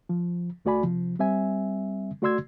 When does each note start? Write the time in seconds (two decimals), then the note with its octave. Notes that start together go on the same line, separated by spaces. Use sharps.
0.09 F3
0.65 C#2 A3 F#4 D5 G#5 B5
0.83 C3 F3
1.19 G3 C4 E5 G#5
2.22 A3 F#4 D5 C6 E6 G#6